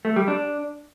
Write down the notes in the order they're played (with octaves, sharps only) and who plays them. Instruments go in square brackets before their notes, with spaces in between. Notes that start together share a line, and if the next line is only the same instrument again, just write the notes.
[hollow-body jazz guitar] A3
G3
D4